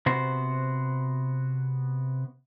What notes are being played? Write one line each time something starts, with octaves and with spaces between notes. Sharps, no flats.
C3 B3 F#4 C5